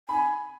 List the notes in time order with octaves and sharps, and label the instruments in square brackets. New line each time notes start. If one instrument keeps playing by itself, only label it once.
[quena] G#5 [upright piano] B5